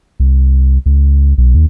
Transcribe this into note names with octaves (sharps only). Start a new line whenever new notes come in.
C2
C#2
B1
D#2